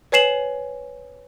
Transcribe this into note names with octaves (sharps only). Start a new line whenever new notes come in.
B4 C#5 G#5 C7 E7 F#7